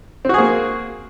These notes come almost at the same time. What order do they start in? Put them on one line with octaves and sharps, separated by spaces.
C4 F#4 G#4 A#3